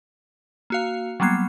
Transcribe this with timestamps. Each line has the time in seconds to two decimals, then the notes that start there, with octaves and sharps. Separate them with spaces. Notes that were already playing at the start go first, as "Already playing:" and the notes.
0.70 A#3 F#4 F5
1.20 F#3 G3 A#3 B3 G#6 C7